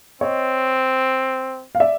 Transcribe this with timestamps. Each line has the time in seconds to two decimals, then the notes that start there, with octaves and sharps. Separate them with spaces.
0.21 C4 C#5 D#5
1.75 F5
1.80 D5 E5